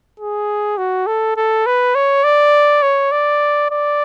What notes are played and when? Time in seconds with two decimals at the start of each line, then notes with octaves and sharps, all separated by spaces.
0.20 G#4
0.78 F#4
1.07 A4
1.37 A4
1.66 B4
1.95 C#5
2.24 D5
2.82 C#5
3.12 D5
3.70 D5